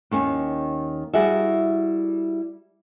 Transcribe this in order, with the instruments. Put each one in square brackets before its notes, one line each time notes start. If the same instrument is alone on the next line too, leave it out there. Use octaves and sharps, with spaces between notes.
[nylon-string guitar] D#2 D#3 C#4
G3 E4 F#4 G#4 E5